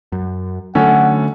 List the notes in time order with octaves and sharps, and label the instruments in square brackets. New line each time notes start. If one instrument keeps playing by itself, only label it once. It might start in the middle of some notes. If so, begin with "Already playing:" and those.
[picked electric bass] F#2
[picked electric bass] D3 F#3 A3 [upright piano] C#4 A4 [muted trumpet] F#5